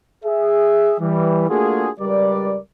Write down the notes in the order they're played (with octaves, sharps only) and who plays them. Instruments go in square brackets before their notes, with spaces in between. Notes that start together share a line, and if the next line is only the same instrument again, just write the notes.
[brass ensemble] G#4 E5
E3 G3
A3 A#3 D4 F4 F#4 G#4
C#2 G3 A#4 B4 D5